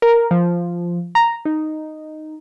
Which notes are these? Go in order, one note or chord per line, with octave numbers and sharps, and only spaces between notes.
A#4
F3
A#5
D#4